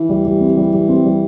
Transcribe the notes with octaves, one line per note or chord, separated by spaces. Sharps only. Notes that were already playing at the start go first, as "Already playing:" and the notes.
Already playing: E3
G3
G3
C4
G3
G3
C4
G3